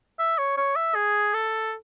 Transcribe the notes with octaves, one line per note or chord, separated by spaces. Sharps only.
E5
C#5
C#5
E5
G#4
A4